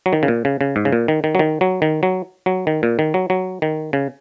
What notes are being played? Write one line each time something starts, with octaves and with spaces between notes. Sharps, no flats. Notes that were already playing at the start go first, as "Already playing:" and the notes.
F#3
D#3
C#3
A#2
C#3
C#3
G#2
C#3
A#2
D#3
D#3
F#3
D#3
F#3
D#3
F#3
F#3
D#3
A#2
D#3
F#3
F#3
D#3
C#3